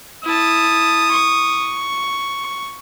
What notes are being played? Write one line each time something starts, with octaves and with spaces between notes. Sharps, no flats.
E4 A5 D#6
C#6